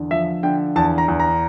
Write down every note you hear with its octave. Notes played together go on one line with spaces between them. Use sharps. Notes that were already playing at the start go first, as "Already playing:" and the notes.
Already playing: E2 D3
F3 E5
D3 G5
E2 A5
A#5
E2
A#5